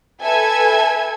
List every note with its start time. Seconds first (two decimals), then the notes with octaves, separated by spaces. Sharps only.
0.21 A4 B4 E5 G#5 G#6